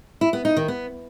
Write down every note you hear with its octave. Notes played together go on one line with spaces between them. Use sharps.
E4
B3
D#4
D#3
B3